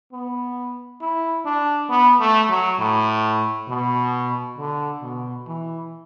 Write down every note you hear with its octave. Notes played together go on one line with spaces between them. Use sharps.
B3
E4
D4
B3
A3
F#3
A2
B2
D3
B2
E3